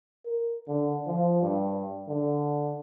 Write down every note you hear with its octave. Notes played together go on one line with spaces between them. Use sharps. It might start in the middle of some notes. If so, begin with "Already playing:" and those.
A#4
D3
F3
G2
D3